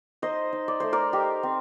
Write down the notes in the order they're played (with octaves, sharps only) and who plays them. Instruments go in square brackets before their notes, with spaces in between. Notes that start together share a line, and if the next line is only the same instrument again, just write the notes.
[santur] D#4 C5 D#5
D#4
D5
A3 C5
A#4 D5
D#4 G4 A#4
C4